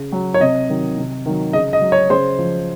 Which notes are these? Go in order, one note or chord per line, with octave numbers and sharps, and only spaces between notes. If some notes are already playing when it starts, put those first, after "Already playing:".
Already playing: C#3
F#3
C#5
C3 D#5
D#3 F#3
C3
D#3 F#3
C#3 D#5
D#5
F#3
C#5
C#3 C5
F3